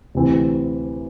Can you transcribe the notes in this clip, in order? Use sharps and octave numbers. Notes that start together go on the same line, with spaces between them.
D2 C3 E3 C4